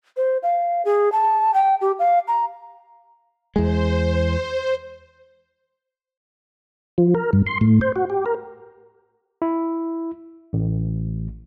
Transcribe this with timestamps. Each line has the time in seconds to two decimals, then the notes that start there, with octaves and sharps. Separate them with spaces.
0.17 C5
0.43 F5
0.85 G#4
1.12 A5
1.54 G5
1.81 G4
1.99 F5
2.28 A#5
3.56 E2 G#3 C5
6.98 F3
7.15 A#4
7.33 G2
7.46 C6
7.61 A2
7.81 C5
7.96 F#4
8.10 G4
8.26 A#4
9.42 E4
10.53 A1